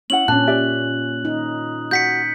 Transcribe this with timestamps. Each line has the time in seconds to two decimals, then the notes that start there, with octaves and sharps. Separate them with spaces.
0.10 C#4 E4 F#5 F#7
0.28 A#2 C#4 D4 A5 F#6
0.47 G4 D5 E5
1.25 D#4
1.91 F#4 F#5 G6 B6 C#7